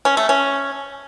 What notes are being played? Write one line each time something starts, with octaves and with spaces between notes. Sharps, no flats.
C#4
A3
C#4